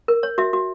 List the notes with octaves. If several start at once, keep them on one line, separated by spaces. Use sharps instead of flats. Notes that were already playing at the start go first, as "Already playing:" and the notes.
A#4
C#5
F#4 E5
F#4